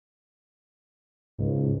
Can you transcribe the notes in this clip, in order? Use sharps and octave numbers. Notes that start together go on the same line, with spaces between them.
C#2 G#2